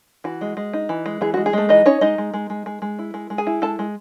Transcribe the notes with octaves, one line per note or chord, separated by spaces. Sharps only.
E3 F#4
G#3
G#3
D#4
E3
G#3
E3 G#4
G#3 F#4
G#4
G#3 A3 A4
E3 D#4 D#5
C#4 D#4 C#5
G#3 D#4 D#5
G#3
G#3
G#3
G#3
G#3
E4
G#3
G#3
G#4 G#5
E4
G#3 A4 A5
G#3